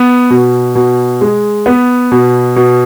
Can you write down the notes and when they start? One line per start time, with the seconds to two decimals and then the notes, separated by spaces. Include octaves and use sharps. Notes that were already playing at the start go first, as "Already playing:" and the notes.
Already playing: B3
0.30 B2
0.75 B2
1.21 G#3
1.66 B3
2.12 B2
2.56 B2